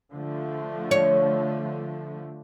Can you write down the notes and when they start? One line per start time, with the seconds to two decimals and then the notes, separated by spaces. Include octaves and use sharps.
0.12 D3 F3 A3
0.91 C#5